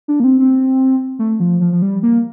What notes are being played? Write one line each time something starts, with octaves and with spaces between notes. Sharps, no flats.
D4
A#3
C4
C4
A3
F3
F3
F3
G3
A#3